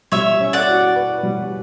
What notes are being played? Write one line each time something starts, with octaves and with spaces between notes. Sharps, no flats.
G3 C#5 E5
C#4
D5 F#5
F#4
B4
G3